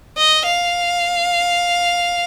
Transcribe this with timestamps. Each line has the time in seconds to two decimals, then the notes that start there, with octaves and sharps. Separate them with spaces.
0.17 D#5
0.45 F5